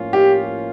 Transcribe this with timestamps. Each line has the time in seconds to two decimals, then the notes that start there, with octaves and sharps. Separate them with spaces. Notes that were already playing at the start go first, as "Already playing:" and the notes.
Already playing: A2 F3 A#3 C#4 F4
0.13 G4